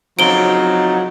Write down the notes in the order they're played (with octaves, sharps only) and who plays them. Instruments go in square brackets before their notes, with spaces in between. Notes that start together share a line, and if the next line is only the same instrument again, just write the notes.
[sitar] F2 C#3 C4 [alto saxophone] F#3 [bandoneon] D#4 [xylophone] D7 G7